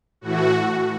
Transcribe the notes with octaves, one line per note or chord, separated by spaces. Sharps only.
A2 E3 A3 F#4